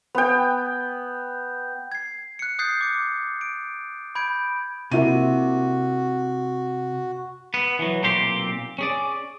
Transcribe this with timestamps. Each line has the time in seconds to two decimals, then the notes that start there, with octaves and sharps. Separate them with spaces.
0.15 B3 G5
1.92 G#6 C7
2.39 F#6 C#7
2.59 D#6 F#6 G6 A6 C7
2.81 D6 C#7
3.41 D7
4.15 B5 G6 G#6 D7
4.91 C3 A#3 E4 F#4 D#7
7.54 B3
7.79 E3 F#3
8.03 B1 A#2 C4 G4 C6
8.79 C#4 G#4 D5